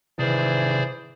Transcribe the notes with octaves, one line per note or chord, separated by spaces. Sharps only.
C3 D#3 E3 G#4 C5 D5